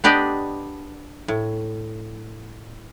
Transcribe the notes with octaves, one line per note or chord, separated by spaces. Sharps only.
B3 D4 G4 D5 D#5 G5
A2